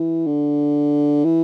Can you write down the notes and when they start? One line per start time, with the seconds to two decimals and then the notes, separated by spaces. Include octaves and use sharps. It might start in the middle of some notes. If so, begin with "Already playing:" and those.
Already playing: E3
0.26 D3
1.25 E3